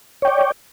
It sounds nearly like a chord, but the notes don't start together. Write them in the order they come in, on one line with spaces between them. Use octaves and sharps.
C#5 G5 D5